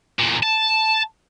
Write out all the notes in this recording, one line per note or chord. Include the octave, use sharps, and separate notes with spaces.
E2 A#2
A5